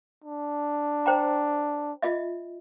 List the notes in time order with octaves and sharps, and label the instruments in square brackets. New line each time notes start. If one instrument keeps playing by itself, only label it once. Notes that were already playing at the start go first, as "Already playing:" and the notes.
[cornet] D4
[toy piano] C5 G5 A#5
F4 D#5 E5